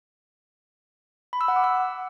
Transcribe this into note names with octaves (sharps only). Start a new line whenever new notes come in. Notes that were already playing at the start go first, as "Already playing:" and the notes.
B5
E6
F#5
D6
E6